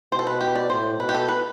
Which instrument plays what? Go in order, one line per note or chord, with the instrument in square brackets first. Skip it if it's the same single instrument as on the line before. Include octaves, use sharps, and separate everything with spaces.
[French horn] B2 [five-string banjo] C5
[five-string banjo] A4
B4
G4
D5
[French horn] A2 [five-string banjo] C5
[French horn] B2 [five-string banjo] B4
[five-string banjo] G4
A4
B4